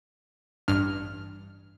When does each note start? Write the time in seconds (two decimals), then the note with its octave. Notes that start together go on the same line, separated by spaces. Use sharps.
0.68 A1 G2 F6